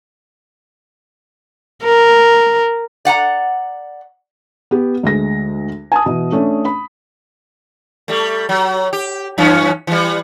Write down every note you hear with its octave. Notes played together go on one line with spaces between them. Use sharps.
A#4
D5 F#5 G#5 A#5
B3 G4
D2 G#3 A#6
G#5 A5 D#6
B2 E3
A3 C#4 D4
B5
G3 A3
F#3
G4
F#2 E3 C#4
E3 G3